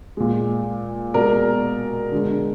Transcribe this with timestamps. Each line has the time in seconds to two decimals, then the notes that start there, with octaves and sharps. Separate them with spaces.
0.17 A#2 G#3
1.14 B2 G#3 A#4 D5
2.12 D3 G#3